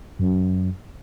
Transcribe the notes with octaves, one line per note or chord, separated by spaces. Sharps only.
F#2